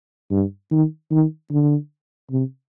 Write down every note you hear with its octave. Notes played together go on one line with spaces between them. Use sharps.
G2
D#3
D#3
D3
C3